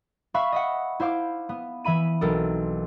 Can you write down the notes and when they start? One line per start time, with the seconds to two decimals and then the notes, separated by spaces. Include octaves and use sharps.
0.34 E5 F5 B5 C#6 F#6
0.52 D#5 E5 F#5
1.00 E4 C5 F5 D6
1.49 B3
1.84 E3 E5 B5 D#7
2.21 B1 C4 A4 A#4